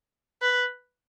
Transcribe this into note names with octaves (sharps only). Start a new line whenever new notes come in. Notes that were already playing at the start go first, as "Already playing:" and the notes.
B4